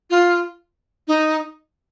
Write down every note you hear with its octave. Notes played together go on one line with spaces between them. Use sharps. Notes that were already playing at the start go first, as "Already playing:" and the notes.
F4
D#4